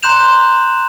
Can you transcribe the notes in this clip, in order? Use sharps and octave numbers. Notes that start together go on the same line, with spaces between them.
A#5 C6 F#6 G6 E7 F7